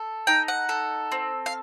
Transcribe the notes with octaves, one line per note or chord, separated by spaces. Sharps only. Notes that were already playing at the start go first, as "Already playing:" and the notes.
Already playing: A4
D#4 G5
F#5
A4
C4
F5